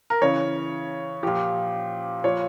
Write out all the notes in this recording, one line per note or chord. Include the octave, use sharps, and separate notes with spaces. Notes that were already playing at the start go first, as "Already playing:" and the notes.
A#4
C#3 E3 C#5
A#2 F3 G4
A#2 F3 C#5